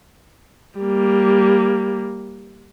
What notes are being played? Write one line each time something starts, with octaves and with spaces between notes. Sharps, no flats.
G3 A#3